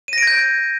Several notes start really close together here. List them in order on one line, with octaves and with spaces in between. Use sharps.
D#7 A#6 D7 G#6 G6